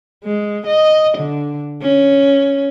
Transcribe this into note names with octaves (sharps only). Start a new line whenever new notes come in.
G#3
D#5
D3
C#4